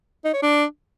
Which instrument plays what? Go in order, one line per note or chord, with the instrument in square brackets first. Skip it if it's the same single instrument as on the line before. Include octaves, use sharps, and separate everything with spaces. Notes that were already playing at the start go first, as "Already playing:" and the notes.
[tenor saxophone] D#4
C#5
D4